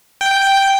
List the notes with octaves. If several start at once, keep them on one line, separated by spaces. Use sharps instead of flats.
G5